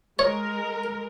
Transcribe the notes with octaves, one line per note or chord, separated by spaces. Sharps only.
G#3 A#4 C#5